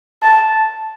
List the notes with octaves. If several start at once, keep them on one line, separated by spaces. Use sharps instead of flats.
A5